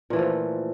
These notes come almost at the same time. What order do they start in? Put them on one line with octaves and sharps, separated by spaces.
A#2 E3 A3 F3